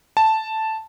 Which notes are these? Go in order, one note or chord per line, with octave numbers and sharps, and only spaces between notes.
A5